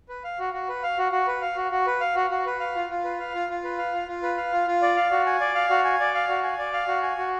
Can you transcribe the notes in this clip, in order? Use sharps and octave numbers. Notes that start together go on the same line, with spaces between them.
B4
F5
F#4
F#4
B4
F5
F#4
F#4
B4
F5
F#4
F#4
B4
F5
F#4
F#4
B4
F5
F4
F4
B4
F5
F4
F4
B4
F5
F4
F4
B4
F5
F4
F4
D5
F5
F#4
G#5
D5
F5
F#4
G#5
D5
F5
F#4
G#5
D5
F5
F#4
G#5
F#4